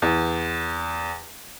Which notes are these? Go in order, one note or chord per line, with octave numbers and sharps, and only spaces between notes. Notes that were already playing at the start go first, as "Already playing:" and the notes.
E2